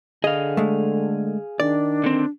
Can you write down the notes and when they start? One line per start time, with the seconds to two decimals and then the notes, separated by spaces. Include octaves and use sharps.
0.24 D3 G#4 D#5 F5
0.57 G#3 A3
1.60 D#3 D4 D5
2.04 D3 C4